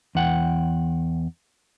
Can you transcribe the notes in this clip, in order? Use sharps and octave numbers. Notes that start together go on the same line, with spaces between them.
E2 F#5 G5